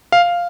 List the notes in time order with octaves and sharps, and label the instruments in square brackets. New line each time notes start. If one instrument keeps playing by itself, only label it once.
[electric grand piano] F5